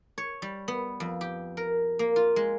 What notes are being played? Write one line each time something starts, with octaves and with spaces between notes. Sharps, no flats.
C#5
G3
B3
F2
G4
A#4
A#3
F4
G#3